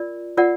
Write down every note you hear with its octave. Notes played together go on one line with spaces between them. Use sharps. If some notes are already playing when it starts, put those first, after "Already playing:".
Already playing: F4 A#4 D5
F4 A#4 D5 F#5